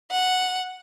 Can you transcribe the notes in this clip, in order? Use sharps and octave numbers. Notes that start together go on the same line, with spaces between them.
F#5